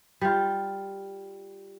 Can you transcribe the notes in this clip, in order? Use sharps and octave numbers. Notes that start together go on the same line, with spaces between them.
G3 F4